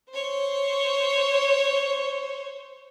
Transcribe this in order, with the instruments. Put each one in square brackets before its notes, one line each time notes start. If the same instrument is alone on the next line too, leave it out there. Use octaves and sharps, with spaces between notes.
[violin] C5 C#5